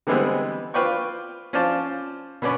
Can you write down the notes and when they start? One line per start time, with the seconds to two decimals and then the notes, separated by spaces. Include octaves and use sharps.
0.07 D3 E3 G3 G#3 B3 C4
0.74 F4 B4 C5 D5 G5 C#6
1.53 C#4 F4 C5 D5 A5
2.42 B2 B3 C#4 D5 B5